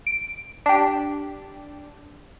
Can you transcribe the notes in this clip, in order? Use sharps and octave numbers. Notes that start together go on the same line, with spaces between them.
D7
D4 G4